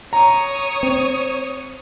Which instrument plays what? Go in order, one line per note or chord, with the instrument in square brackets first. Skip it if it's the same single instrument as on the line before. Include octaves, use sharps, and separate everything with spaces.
[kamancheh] C#5 D#6 [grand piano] A#5
[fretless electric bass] C4